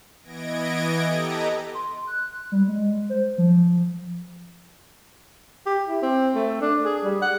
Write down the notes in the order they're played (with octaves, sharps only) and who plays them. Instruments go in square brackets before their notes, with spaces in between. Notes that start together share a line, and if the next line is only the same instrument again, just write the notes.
[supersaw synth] E3 B3 D#5 G#6 A#6 D7
G4 A4 B4 D#5 A#5
[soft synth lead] C6
F#6
G3
G#3
C5
F3
[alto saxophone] G4
E4
C4
A3
D4
G#4
G3
F#5